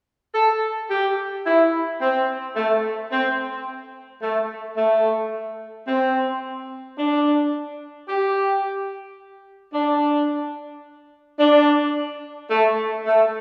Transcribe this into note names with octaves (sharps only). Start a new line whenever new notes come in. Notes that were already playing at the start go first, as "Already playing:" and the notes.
A4
G4
E4
C4
A3
C4
A3
A3
C4
D4
G4
D4
D4
A3
A3